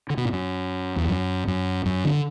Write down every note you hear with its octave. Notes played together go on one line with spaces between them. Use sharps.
D3
B2
A2
F#2
E2
F#2
F#2
F#2
D3